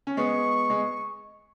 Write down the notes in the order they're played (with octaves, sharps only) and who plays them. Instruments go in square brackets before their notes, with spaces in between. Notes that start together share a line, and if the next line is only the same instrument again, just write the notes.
[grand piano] C#4
[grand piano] G#3 B3 [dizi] C#6
[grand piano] G#3